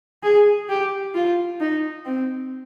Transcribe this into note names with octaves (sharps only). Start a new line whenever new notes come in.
G#4
G4
F4
D#4
C4